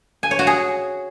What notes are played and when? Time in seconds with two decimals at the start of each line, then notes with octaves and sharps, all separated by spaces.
0.23 G#5
0.31 C#5
0.39 F#4
0.47 G#4